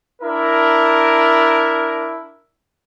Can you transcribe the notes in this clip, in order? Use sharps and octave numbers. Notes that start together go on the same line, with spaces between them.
D4 E4 A#4